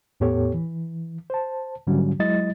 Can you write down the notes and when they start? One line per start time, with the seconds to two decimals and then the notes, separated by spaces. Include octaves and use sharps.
0.20 E2 A2 B3 G4 A4 C#5
0.54 E3
1.30 C5 A5
1.87 G#2 D3 F#3 G3 C#4 F#4
2.19 F#3 G#3 E4 D#5 A6